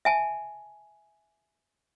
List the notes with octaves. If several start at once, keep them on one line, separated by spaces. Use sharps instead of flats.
E5 G#5 A5